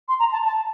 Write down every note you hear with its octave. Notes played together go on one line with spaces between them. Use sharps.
C6
A#5
A5
A5